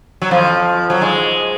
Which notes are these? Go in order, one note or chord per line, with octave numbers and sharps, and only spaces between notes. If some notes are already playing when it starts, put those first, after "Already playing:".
F#3
F2 F3
F#3
G#2 G#3